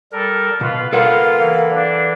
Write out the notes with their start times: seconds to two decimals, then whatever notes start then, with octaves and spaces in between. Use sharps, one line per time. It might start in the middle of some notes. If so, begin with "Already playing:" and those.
0.12 G3 A4 A#4
0.61 B2 F4 B4
0.93 A#3 F4 A4 B4 F5 F#5
1.38 E3
1.71 D4